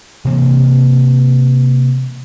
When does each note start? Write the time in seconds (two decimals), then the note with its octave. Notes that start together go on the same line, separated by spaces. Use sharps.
0.25 C3 E3 A#3 C4